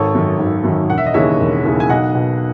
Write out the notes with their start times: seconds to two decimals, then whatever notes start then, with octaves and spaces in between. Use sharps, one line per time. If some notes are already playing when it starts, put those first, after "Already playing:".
Already playing: G#1 A4 C#5
0.15 F#2 D#3
0.39 G#1
0.64 F#2 D#3
0.90 E1 F#5
0.98 E5
1.06 D#5
1.14 D#2 C#3 E3 C#5 E5
1.40 E1
1.64 D#2 C#3 E3
1.80 G#5
1.89 B1 D#5 F#5
2.15 B2